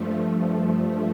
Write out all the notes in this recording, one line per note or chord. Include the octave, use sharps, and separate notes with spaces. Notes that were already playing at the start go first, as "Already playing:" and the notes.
Already playing: G2 F3 A3